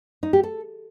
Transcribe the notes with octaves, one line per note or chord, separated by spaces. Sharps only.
D#4
G4
A4